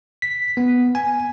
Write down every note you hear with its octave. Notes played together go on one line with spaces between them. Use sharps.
B6
B3
G#5